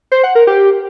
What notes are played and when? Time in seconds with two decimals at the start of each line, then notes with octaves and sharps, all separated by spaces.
0.12 C5
0.23 F#5
0.35 A#4
0.47 G4